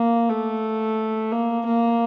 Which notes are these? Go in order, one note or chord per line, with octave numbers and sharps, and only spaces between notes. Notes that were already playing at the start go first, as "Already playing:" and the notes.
Already playing: A#3
A3
A#3
A#3